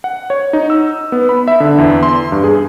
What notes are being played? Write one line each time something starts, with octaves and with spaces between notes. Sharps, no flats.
F#5
C#5
D#4
E6
B3
B5
E5
D3
E2
C6
G2
G#4